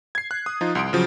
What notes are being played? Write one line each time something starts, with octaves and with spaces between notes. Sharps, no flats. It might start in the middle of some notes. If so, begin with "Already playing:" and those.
G#6 C7
F#6
D#6
F3 D#4 F4
C2 C6 D7
C#3 F3 F#3